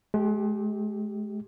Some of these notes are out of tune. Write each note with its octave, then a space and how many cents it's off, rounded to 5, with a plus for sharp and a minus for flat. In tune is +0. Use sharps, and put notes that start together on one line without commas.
G#3 +40 G4 -5